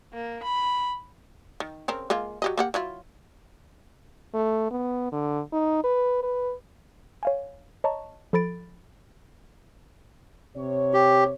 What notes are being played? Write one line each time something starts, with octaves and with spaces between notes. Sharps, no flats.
A#3
B5
D#3
C#3 C4 A#4
G#3 A#3 F4
F#3 G4 D#5
A#3 G4 F#5
F#3 E4 F4
A3
B3
D3
D#4
B4
B4
C#5 F5 G#5
C#5 D#5 A5 A#5 C#6
F3 A4 B5 A6 D7
C3 C#5
G4